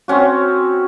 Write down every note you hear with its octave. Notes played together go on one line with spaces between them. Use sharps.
C4 C#4 F#4